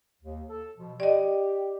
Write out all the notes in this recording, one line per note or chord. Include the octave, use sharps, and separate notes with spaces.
D#2
A4
B2 F3
G4 D5 D#5